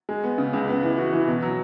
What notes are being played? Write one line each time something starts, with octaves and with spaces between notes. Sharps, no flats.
G#3
B3
C#3
C#2
B3
E3
F#4
E3
B2
F#3